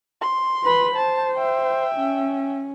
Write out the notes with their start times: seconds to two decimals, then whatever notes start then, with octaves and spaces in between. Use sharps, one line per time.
0.21 C6
0.63 B4 B5
0.95 C5 A5
1.34 E5 G5
1.96 C#4